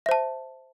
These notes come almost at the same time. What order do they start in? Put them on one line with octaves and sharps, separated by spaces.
E5 C5 A5